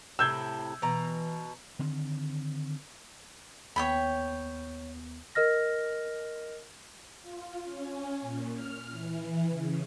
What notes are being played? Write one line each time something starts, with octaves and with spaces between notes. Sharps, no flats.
A2 C3 E4 E6 G6 G#6
B2 E3 A#5
D3 D#3 C4
D#2 B3 C#5 G5 B5
A#4 D#5 F6 A#6
F4
C#4
A#2
F6
E3
C#3